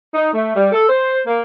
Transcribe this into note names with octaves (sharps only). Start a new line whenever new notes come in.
D#4
A3
G3
A4
C5
A#3